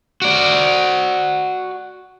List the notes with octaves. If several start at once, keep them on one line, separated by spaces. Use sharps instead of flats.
F#4 D5